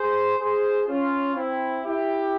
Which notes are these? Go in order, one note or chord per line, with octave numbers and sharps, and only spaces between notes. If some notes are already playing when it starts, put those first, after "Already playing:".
Already playing: G#4 C5
G#4 C5
C#4 F4
C4 E4
E4 G4